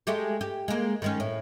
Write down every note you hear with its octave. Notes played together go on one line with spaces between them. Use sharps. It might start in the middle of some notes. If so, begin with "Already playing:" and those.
G#3 A3 G4
G4
G#3 A#3
D#3 G#3 C#4
A2